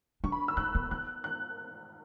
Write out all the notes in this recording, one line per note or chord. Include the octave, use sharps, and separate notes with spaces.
D4 C#6
B5
E6
C#4 F#6
B3
B3 F#6
F#6